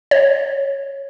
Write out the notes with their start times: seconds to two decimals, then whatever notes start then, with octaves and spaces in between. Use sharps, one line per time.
0.11 C#5